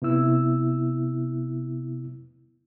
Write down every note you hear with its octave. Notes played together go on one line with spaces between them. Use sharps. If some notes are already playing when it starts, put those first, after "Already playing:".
C3 B3 E4 E6